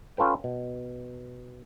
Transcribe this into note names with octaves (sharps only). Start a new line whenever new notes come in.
C#4 F4 A4 B4 G5
B2